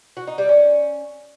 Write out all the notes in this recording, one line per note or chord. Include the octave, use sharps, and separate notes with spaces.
F#4
D#4
G3
C#4